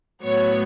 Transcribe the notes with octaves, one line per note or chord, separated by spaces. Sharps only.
A2 F#3 B3 C#5